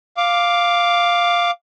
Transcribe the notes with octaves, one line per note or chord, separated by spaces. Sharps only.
F5 D6